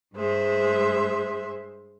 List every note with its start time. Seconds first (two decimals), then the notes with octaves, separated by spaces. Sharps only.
0.15 G2 G#3 C5 E5